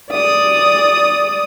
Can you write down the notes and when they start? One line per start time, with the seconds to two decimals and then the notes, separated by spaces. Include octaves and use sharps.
0.10 D5 D#6